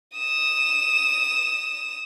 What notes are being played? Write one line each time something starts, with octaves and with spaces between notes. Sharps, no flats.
D#6 E7